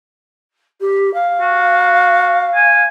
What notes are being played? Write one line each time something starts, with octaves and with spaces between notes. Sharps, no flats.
G4
F5
F#4
G#5